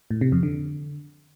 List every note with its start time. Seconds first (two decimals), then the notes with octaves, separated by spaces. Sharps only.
0.11 A2
0.21 C3
0.32 F2
0.43 D3